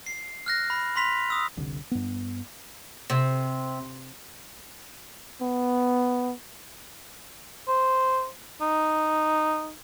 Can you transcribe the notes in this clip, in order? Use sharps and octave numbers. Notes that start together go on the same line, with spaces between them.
C7
F6 F#6 A#6
B5
B5 C6 B6 F7
D#6 E6
F1 C2 D3
G2 B3
C3
B3
C5
D#4